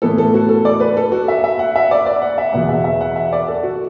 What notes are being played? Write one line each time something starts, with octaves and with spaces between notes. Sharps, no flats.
A2 E3 B3 E4 A4
A4
F#4
A4
D5
B4
A4
F#4
E5
E5
F#5
E5
D5
D5
F#5
E5
E2 B2 B3 F#5
E5
E5
F#5
E5
D5
A4
F#4